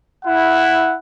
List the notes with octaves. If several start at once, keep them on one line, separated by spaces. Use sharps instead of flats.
E4 F#5